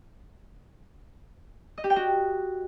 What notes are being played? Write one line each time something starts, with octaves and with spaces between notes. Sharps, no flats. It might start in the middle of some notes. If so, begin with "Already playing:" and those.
D#5
G4
G5
F#4